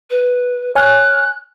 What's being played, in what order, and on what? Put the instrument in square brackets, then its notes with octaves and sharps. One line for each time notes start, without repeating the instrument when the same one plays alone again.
[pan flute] B4
[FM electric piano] C#5 G#5 F6 [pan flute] F#6